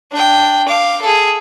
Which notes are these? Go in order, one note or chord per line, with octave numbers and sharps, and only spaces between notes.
D4 G5
F5 D6
G#4 A4